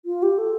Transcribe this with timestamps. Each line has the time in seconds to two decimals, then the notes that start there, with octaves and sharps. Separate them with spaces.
0.05 F4
0.22 G4
0.38 A4